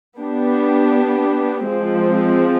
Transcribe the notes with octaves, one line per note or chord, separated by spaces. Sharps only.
B3 D4 G4
F3 G#3 C4